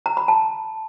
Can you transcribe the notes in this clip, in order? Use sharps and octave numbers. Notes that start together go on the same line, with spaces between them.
A#5
B5
A5